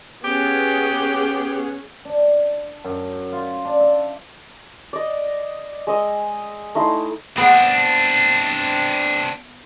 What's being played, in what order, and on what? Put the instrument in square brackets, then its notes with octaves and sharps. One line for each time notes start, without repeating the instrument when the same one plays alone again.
[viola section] B3 C#4 G#4 [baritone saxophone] G4
[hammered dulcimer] D4
F#2
F4
D4
E5
[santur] D5 D#5
G#3 D#5 E6
A3 D#4 E4 C6
[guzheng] B3 [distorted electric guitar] C4 D4